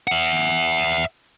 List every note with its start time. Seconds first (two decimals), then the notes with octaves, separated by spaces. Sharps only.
0.07 E5 F#5